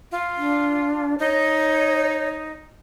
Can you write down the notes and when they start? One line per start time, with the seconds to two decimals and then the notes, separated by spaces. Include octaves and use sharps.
0.12 F4
0.37 D4
1.20 D#4 C#5